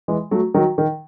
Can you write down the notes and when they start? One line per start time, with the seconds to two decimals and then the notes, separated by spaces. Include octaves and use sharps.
0.08 E3 G#3
0.31 F#3 A3
0.54 D#3 F#3
0.78 D#3